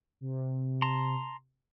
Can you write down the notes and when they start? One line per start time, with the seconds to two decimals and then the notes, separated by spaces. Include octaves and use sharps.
0.21 C3
0.82 A5 A#5 C6